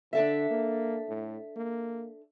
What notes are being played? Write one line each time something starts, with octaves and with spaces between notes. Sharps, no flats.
D3 D4 A4 E5
A#3
A2
A#3